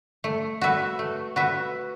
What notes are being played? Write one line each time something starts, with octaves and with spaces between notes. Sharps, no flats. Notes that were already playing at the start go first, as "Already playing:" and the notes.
A3
F#4 B4 E5
A3
F#4 B4 E5